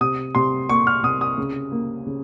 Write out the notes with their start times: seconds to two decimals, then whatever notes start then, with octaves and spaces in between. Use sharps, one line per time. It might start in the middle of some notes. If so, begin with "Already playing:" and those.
0.01 C3 D#6
0.35 C3 C6
0.69 A#3 C#6
0.87 F6
1.03 C3 D#6
1.21 D#6
1.38 C#3
1.72 A#3
2.07 C#3